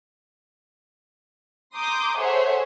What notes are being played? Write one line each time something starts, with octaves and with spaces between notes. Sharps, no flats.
A#5 C6 D6 D#6 G6
G#4 A4 C5 C#5 E5 F#5